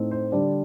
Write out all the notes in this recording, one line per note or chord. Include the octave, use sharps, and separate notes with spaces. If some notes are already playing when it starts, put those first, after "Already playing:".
Already playing: A2 A3 C4 D#4
C5
D3 G3 D4 D5